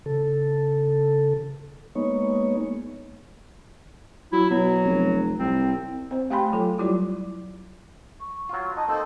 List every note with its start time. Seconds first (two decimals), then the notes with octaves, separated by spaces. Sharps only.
0.06 C#3 A4
1.95 G#3 A#3 B3 D#4 C#5
4.32 F#3 E4
4.50 B2 F#3
4.85 F1
5.39 C2 C4
6.11 C4 C5
6.31 A3 G4 G5 G#5 B5 C6
6.52 F#3 F4 A4
6.78 F#3 G3 E4 F4 G4
8.20 C#6
8.49 F#3 F4
8.77 D#4 D#5 A5
8.88 A#3 C4 D#4 A4